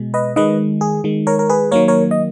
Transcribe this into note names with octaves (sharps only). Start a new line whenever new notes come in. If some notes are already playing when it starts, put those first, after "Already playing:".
Already playing: B2 G#3
B4 D#5
D#3 G#3 B4 D#5
G#4
D#3 G#3
A#4 C#5
A#4
G#4 B4
D#3 F#3 A#3 A#4 C#5
A#4 C#5
D#5